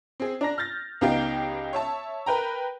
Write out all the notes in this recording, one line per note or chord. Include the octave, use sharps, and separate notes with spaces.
C4 G#4
D4 A#5 A#6
F6 G6 A6 A#6
C#2 B3 D#4 G4 F5 G5
C#5 E5 A5
A#4 B4 G5 A#5